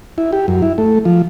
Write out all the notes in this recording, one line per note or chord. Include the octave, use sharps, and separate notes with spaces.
E4
G4
F#2
E4
A3
F3